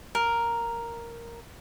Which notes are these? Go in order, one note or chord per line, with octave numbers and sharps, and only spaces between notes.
A#4